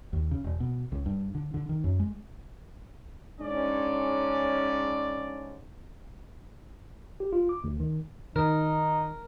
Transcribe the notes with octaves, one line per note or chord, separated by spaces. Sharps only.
D#2
C#3
E1
B2
C#2
G2
D3
D3
D#3
F#2
G#3
G#2 C#4 D4 D5
G4
F4
D6
D2
D#3
D#3 D#4 A#4